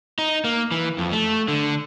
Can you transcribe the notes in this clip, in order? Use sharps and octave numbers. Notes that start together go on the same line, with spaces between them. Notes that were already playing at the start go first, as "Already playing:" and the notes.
D#4
A#3
E3
F2
A3
D3